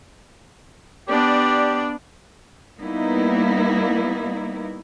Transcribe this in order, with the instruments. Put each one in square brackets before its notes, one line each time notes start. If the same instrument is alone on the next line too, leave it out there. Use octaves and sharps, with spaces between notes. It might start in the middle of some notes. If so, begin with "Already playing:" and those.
[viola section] B3 D4 D5 [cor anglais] G4
[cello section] G3 A#3 B3 D#4 E4